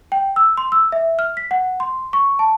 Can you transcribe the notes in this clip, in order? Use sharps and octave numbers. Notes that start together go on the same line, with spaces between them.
G5
E6
C6
E6
E5
F6
B6
F#5
C6
C#6
A5